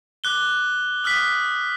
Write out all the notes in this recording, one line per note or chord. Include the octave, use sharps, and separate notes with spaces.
D6 F#6 G7
D#6 F6 F#6 B6